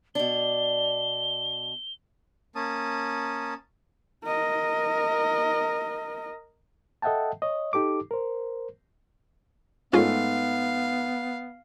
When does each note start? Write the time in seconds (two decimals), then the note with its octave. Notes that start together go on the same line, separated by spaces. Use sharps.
0.15 B2 D4 G7
2.55 A#3 C#4 A5 D#6
4.24 A#4 D#5
7.02 A4 D#5 E5 F#5 G5 A5
7.42 C#5 D#5
7.73 D#4 G4 A4 D6
8.11 A#4 C5
9.93 G#2 A3 B3 C#4 F4 G#4 F5